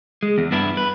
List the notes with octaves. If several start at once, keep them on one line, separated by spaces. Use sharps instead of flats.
G#3
E2
G2 B3 D4 E4
B4